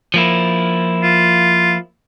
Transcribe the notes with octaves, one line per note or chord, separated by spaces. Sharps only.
F3 A#3 E4
F4